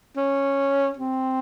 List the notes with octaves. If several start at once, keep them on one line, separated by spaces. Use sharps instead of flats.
C#4
C4